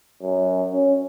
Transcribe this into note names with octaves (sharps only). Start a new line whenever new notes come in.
F#2
C#4